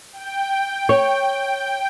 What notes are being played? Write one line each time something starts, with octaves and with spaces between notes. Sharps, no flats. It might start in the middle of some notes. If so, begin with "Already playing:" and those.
G5
C#5